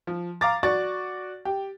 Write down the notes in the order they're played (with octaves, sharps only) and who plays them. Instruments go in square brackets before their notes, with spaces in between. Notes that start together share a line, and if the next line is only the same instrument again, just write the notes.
[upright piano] F3
F5 A#5 D6 A6
F#4 D5 C#6 A6
G4